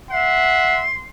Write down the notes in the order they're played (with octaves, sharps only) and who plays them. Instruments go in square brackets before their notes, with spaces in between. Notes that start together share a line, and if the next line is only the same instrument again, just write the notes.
[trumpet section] E5 F#5 [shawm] C6